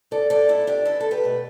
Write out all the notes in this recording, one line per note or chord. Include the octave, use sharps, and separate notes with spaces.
E2 A4 D5
A4 D5
B2 A3 E4 A4
D4 G4
E2 E4 A4
A4
G4 B4
B2 A3